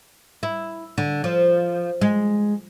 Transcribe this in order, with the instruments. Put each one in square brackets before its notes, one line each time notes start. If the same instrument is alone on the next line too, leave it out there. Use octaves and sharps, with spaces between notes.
[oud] E4
D3
F3
G#3